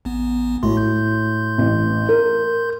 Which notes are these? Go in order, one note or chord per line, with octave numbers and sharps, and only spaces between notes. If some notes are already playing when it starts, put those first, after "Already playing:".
A1 B3
A#1 A2 F#4 C6
C6 G6
A1
A#4